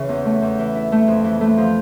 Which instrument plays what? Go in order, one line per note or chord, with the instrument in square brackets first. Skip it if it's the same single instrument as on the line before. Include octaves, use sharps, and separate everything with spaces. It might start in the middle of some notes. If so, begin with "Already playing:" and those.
Already playing: [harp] C#3 E3 C#4
E2
A3
E2
E3
E4
A3
F2
E3
A3
F3